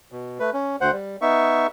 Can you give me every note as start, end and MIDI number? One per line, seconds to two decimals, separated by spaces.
0.11 0.38 47
0.40 0.50 57
0.40 0.50 71
0.53 0.76 61
0.81 0.91 38
0.81 0.91 72
0.81 0.91 78
0.92 1.17 55
1.21 1.67 59
1.21 1.67 63
1.21 1.67 76
1.21 1.67 85